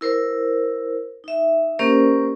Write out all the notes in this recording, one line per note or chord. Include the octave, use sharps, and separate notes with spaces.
E4 A#4 C5
D#4 E5
A#3 C#4 G4 A#4 C5 D5